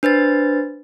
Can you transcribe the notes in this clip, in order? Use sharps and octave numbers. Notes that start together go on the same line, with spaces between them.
D4 B4 C5 A6